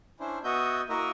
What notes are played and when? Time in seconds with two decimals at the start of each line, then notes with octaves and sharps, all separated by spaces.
0.20 C#4 D4 E4 C5
0.44 B3 F#4 D#5 E5 G6
0.89 A#3 E4 F#4 A#4 D#5 E5